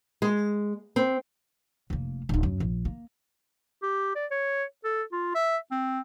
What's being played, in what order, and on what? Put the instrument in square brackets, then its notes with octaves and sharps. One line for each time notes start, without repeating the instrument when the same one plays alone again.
[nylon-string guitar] G#3
C4
[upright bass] F1 A#3
D1 D#4
F#2
A#1
A#3
[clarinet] G4
D5
C#5
A4
F4
E5
C4